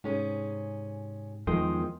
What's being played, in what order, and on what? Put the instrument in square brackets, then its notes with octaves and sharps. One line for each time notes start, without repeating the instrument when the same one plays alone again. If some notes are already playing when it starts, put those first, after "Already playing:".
[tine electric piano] G#2 [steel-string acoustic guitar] C3 C#4 G#4
[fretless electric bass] E2 F3 G#3 [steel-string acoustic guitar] D#3 [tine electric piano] G5 C6 D#6